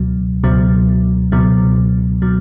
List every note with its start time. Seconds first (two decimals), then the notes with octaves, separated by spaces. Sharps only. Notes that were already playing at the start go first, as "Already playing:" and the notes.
Already playing: C#2 B2 F#3
0.43 C#2 B2 F#3
1.32 C#2 B2 F#3
2.22 B2 F#3